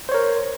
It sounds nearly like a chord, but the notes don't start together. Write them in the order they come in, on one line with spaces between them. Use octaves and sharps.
C5 C#5 A#4